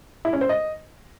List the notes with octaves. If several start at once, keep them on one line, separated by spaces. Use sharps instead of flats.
E4
C#4
C5
D#5